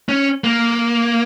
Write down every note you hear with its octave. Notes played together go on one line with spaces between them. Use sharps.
C#4
A#3